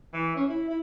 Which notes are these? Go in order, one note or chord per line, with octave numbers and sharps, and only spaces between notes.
E3
C#4
E4
E4